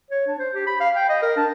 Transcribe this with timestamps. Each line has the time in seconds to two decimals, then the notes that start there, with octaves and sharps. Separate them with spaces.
0.11 C#5
0.27 D4
0.39 C5
0.54 G4
0.67 B5
0.80 F5
0.95 G5
1.09 D#5
1.22 A#4
1.37 D4